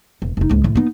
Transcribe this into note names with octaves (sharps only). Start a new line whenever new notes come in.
E1
F1 D#4
C#2 G#2
A2 D3
B3 D#4